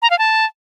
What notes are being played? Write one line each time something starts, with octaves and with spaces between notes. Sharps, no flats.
A#5
F5
A5